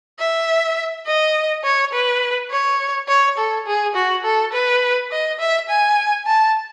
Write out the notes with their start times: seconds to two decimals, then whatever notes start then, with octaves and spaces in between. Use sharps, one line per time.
0.19 E5
1.06 D#5
1.64 C#5
1.93 B4
2.51 C#5
3.08 C#5
3.38 A4
3.66 G#4
3.95 F#4
4.24 A4
4.52 B4
5.10 D#5
5.39 E5
5.69 G#5
6.27 A5